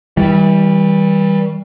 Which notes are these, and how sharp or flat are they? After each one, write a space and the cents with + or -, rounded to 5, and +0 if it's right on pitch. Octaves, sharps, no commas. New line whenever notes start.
E3 -35 G3 +0